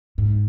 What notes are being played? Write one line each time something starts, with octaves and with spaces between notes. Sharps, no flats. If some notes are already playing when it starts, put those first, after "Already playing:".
G#2